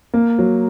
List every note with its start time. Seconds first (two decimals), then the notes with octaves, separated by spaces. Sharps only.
0.14 A#3
0.39 F#3